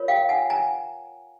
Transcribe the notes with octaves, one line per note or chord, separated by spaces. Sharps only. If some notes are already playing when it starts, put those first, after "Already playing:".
Already playing: F4 A#4 C#5
F5 G5
F#5 G#5
G#5 A#5